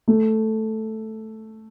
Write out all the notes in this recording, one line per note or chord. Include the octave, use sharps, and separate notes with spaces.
A3